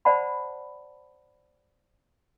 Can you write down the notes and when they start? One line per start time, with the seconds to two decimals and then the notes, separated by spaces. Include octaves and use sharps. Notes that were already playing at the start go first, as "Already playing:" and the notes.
0.05 C5 D5 F#5 A5 B5